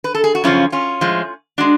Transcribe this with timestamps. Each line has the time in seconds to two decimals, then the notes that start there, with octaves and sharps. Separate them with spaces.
0.04 B4
0.15 A4
0.24 G#4
0.35 F#4
0.44 F#2 C#3 F3 C#4 F4
0.72 C#4 F4
1.01 A2 F3 G#3
1.58 G#3 D4 F#4